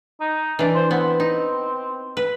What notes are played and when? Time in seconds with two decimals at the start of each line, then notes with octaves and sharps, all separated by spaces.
0.21 D#4
0.59 E3 D4
0.75 C5
0.91 B3 C4
1.20 D#4
2.17 B4